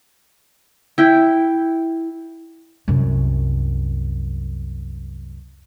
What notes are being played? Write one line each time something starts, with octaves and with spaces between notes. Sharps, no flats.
E4 G5
C2 F#2